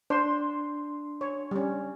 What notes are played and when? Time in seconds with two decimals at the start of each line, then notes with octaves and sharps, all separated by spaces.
0.10 D4 C5 C6
1.21 C#5
1.51 G3 C#4